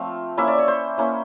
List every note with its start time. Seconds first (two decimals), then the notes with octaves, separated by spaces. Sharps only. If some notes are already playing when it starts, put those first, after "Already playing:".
Already playing: F3 A3 C4 F5
0.38 A#3 C#4 E4 E5
0.48 D5
0.58 C#5
0.68 C5
0.98 A#3 C#4 E4